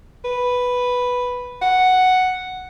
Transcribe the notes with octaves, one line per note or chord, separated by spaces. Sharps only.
B4
F#5